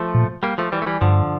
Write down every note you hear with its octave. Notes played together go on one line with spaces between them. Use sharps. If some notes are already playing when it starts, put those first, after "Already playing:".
Already playing: F3 A3
A#2
G3 A#3
F3 A3
E3 G3
A3
E3 G3
G2 D3 F3